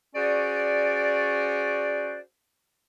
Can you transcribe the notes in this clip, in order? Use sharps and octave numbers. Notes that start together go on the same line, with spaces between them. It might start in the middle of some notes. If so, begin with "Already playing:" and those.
C#4 F#4 G#4 C5 D5